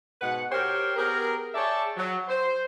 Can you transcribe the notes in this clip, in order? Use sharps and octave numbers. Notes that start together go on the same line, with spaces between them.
G#2 B2 B4 F#5
G4 A#4 C5 C#5 G5
B3 G4 G#4 A#4
G#4 C#5 D5 E5 G5 A5
F#3
C5